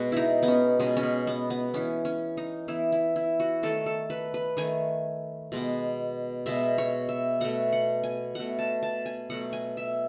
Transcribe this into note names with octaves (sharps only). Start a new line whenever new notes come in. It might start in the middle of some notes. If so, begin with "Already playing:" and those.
Already playing: B2 G#3 B3 F#4
D#4 E4
B3
C#4
B2 G#3 B3 C#4
C#4
B3
B3
B3
E3 B3 C#4
C#4
D#4
E3 B3 E4
E4
E4
F#4
D#3 A3 A4
A4
B4
B4
D#3 A3 G#5
B2 G#3 B3
B2 G#3 B3 E5
C#5
E5
B2 A3 F#5
F#5
G#5
B2 A3 F#5
A5
A5
G#5
B2 F#3 A3 F#5
G#5
E5